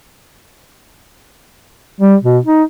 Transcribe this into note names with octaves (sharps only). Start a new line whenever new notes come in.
G3
B2
D#4